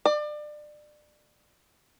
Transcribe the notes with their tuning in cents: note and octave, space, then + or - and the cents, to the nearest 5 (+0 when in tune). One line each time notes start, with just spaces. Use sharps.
D5 +30